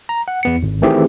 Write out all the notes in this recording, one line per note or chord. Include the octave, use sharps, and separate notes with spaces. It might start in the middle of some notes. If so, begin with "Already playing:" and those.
A#5
F#5
E2 B3 C#7
G#1
D#3 E3 A3 C4 G4 G#4